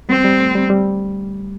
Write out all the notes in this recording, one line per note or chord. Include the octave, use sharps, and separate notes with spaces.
G3 C4
G3
A3
G3
G3